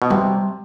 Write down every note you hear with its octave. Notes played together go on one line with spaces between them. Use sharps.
B2
C3 G3